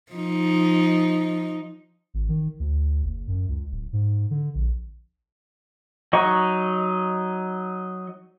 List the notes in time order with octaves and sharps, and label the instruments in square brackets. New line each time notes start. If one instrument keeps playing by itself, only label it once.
[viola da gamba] F3 D#4
[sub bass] G#1
D#3
D2
F#1
F#2
C#2
D1
G#2
D3
A#1
[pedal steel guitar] F#3 D#4 D#5 C#6